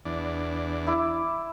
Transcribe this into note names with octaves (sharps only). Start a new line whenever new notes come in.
E2 D4
E4 D6